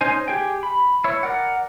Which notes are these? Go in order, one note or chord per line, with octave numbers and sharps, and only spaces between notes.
C#4 D#4 C5 G#5
G4 G#4 G5
B5
E4 C#5
A#4 D5 F#5